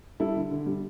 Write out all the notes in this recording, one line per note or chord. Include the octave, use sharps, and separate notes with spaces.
G3 E4 A4
D3
D3
G3